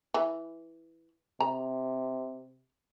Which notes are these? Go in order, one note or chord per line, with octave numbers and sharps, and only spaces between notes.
E3
C3 A#5